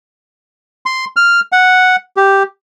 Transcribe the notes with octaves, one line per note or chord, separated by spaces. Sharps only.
C6
F6
F#5
G4